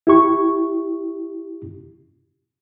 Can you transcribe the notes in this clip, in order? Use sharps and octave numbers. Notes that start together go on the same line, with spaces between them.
E4 G4 C#6